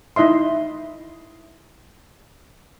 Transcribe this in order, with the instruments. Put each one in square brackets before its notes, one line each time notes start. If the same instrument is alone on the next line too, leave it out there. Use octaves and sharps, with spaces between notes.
[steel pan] D#4 E4 D#5 E5 C6